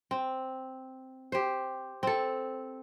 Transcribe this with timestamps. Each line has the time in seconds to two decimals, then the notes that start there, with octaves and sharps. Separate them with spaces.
0.11 C4
1.32 G4 C5
2.03 C4 A4